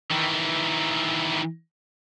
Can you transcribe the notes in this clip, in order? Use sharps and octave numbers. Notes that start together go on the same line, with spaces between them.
D#3 E3